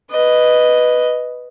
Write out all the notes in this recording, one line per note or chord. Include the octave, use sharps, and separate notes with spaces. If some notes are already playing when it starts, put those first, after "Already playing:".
B4 D#5